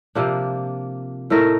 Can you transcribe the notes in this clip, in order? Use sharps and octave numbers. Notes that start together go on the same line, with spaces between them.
C3 F3 A#3 D4
A2 A3 D#4 A#4